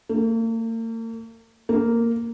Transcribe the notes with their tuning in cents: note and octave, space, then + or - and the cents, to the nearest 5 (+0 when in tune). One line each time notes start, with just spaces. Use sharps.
A#3 -45
A#3 -10